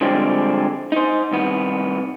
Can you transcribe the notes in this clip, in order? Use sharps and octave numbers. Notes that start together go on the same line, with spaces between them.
D3 F3 G3 G#3 C4
D#4 C5
C2 D#3 B3